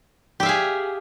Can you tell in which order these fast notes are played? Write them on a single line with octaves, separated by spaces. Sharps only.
G4 E5 F5 G#4